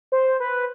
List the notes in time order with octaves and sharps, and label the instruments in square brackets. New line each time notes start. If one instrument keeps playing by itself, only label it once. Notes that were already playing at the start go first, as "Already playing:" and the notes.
[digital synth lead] C5
B4